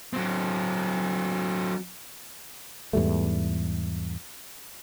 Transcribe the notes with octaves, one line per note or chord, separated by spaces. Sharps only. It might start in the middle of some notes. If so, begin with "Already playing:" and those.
F#3 C4
E2 G#2 G3 A3